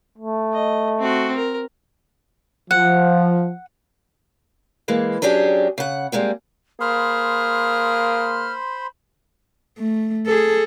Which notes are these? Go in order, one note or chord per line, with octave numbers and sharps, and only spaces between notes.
A3
D#5
C4 F#4
A#4
F3 F#5
E3 G#3 A#3
F#3 C#4 D4 G4 G#4
C#3 F#5
G3 G#3 A#3 C4
A#3 G#4 C5 B5 C6 F6
A3
G#4 A4